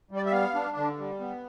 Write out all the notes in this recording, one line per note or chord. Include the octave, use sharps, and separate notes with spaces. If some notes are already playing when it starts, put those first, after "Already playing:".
G3
D5
E5
B3 F5
D4
D3
G3
B3